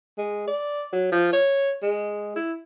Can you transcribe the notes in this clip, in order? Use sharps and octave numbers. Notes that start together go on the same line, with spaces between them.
G#3
D5
F#3
F3
C#5
G#3
E4